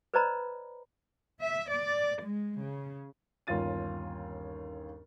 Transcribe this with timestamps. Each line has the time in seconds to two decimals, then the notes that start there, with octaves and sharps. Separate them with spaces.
0.14 B4 C5 D5 D#5 A#5 B5
1.40 E5
1.70 D5
2.22 G#3
2.61 C#3
3.47 G1 D#2 C#4 F4 A6 D#7